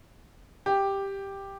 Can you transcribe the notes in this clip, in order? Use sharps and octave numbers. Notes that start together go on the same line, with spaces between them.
G4